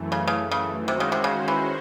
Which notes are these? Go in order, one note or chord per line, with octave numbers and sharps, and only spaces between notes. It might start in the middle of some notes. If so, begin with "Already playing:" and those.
Already playing: F#2 E3 A3
C#3
C#3
C#3
D#3 G#3 C#4 F#4 C5
C3
C#3
C3
C#3
E3